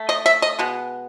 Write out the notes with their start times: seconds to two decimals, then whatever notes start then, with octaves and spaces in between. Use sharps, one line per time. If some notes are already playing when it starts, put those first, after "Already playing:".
Already playing: A3
0.09 D#5
0.26 E5
0.42 D#5
0.59 B2 G#3 B3